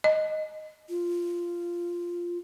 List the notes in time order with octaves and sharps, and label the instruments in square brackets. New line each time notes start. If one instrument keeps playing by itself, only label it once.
[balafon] D#5
[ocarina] F4